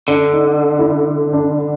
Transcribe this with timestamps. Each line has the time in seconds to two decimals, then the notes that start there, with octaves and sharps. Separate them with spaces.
0.08 D3 D4
0.32 D#4
0.79 E4
1.33 D4